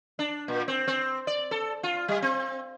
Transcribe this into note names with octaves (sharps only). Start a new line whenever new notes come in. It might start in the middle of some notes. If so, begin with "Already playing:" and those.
D4
A#2
C4
C4
D5
A4
F4
G3
C4